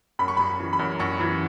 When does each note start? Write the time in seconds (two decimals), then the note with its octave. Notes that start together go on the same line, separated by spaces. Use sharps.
0.19 F#2 B5
0.28 C#6
0.37 F#2 B5
0.59 E3
0.73 B5
0.79 F#2
1.00 F#2 C#6
1.20 E3